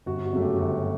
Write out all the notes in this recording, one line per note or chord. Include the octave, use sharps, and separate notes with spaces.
G1 F#4
F#4
F#2 C#3 F#3 A3
G4
G1 F#4